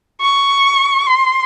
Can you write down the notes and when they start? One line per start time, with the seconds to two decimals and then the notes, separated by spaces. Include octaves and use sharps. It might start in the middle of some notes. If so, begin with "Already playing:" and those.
0.21 C#6
1.06 C6